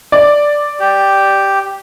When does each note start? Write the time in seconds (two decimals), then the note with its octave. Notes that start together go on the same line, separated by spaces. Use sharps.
0.12 D5
0.80 G4